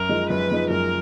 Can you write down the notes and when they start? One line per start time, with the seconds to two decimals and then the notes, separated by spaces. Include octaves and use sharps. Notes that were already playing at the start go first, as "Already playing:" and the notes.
Already playing: F#2 A#4
0.09 F3 G#3 D#4
0.29 F#2 B4
0.50 F3 G#3 D#4
0.70 F#2 A#4